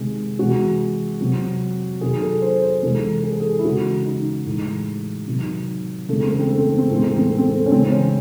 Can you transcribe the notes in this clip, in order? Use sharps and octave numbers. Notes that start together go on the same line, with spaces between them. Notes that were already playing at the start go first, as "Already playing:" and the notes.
Already playing: C3 D#3 G#3
C3 E3 G#3 F#4
C3 F#3
C3 D#3 F#3 G#4
A4
C5
C5
C3 E3 G#3 A4
G#4
A4
G#4
E4
C#3 E3 G#3 F#4
D#4
A2 E3 G#3
C3 D#3 F#3
C#3 E3 G#3 A3
C4
A3
C4
A3
C4
A3
C4
A2 E3 G#3 A3
C4
A3
C4
A3
C4
A3
C#4
C#3 E3 G#3 C4
C#4